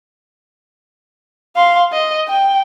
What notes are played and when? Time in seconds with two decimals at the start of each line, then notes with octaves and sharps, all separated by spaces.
1.56 F5 C6
1.93 D#5
2.29 G5